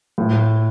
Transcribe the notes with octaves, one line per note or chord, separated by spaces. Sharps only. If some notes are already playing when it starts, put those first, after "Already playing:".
A2